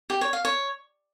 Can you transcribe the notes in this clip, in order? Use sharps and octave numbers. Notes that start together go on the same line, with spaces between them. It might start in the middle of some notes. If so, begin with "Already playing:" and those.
G4
C#5
F5
C#5